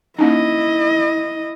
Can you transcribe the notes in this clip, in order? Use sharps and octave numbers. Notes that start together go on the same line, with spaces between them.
A#3 C#4 D#4 E4 D#5